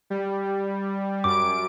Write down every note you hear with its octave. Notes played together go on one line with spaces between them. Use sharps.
G3
F#2 D6 D7